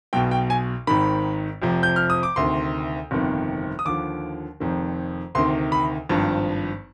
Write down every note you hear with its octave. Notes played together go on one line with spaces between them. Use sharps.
B1 B2 G5
G5
G#5
G#1 G#2 D#3 B5
F1 F2 C3 F3
G6
F6
D#6
D6
D2 C3 D#3 C6
G1 F2 C3 D#3
D#6
D#2 D3 F3 D6
F1 F2 D#3
D2 C3 D#3 C6
B5
G#1 G2 F3